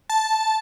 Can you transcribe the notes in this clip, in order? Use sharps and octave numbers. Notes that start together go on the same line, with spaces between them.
A5